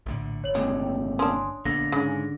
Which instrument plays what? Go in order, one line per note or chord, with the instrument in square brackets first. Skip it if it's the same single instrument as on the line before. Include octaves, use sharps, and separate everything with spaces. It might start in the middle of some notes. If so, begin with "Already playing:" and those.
[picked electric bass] A#1 A2 D3
[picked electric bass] G1 [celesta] C#5 F#7
[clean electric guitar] D#2 A2 C3 [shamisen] G#3
[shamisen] C#4 D4 [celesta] G#5 C6 D#6
[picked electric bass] A#1 A#3 B3 [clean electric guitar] D3 [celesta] A#6
[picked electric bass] G#2 [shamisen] C#3